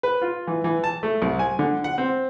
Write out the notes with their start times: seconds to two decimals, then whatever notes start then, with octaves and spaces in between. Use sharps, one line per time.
0.03 B4
0.22 F4
0.47 E3
0.64 E3
0.84 A5
1.03 A3
1.22 C2
1.39 G#5
1.59 D3
1.84 F#5
1.98 C4